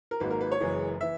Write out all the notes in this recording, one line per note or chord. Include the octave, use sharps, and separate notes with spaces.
A#4
G#1 G#2 F#3 A#3 B4
A#4
B4
C#5
F#1 F#2 E3 G#3
E3 E5